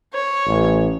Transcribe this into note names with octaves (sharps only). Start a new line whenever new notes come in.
C#5
A1